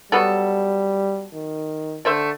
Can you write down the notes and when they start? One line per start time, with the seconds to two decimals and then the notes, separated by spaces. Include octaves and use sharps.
0.12 F#3 G3 B3 A4
1.34 D#3
2.05 D3 A3 C5 E5